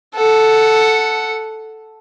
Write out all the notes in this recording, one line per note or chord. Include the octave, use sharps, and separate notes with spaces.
A4 F#5